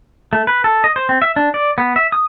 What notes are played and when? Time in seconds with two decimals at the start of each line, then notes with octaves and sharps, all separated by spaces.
0.33 A3
0.47 B4
0.64 A4
0.84 D#5
0.96 C5
1.09 C4
1.22 E5
1.36 D4
1.54 D5
1.78 B3
1.96 E5
2.12 D#6